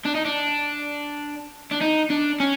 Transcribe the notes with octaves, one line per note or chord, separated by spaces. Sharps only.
D4
D#4
D4
D4
D#4
D4
C#4